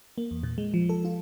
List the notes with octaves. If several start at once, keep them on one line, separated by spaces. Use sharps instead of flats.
A#3
E2
A#2
G#3
F3
A4
F4